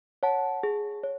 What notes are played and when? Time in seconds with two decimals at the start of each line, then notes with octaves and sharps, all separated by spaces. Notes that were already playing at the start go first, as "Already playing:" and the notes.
0.23 C#5 F#5 A5
0.63 G#4
1.04 C#5